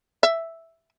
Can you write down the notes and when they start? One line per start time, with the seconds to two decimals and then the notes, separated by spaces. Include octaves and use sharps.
0.23 E5